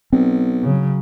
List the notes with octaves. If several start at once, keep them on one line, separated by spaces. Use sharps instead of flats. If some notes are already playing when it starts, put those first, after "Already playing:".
B1 C4
C#3 F#3